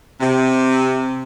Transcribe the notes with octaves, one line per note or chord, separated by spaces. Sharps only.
C3